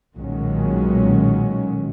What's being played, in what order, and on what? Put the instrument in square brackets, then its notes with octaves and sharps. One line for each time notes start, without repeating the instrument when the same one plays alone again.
[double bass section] B1 A#2 D#3 F#3 G#3 C#4